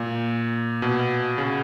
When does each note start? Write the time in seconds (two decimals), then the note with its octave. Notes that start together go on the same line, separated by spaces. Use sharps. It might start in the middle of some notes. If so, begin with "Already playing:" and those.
Already playing: A#2
0.82 B2
1.38 C#3